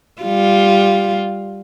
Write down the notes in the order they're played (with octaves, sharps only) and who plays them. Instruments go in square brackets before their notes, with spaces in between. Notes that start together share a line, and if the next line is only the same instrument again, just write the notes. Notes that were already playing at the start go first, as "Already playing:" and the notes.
[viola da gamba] G3 F4